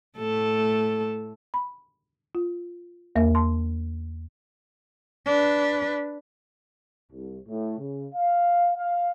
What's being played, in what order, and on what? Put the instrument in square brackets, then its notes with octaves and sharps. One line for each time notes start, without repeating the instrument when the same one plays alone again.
[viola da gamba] A2 A3 A4
[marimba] B5
F4
E2 A#3 A#4 E5
A5 C6
[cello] D4 B4
[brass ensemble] C2
A2
C#3
F5
F5